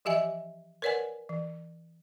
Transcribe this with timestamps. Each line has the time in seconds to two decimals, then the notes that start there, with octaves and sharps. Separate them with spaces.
0.05 E3 F3 G4 D#5 E5 G#5
0.82 A#4 B4 C#5 D5 F#5 G#5
1.29 E3